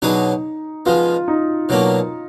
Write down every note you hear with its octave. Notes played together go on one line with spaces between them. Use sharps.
B2 F#3 D4 D#4 G#4 B4
F3 G#3 B3 F4
D#4
B2 F#3 A#3 D4